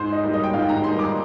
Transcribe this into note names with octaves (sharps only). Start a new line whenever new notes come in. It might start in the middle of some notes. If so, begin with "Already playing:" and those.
Already playing: G#2 C5
D#5
G3 A#3 D#4
D#5
G5
G#2 F5
A#5
G3 A#3 D#4 C6
D6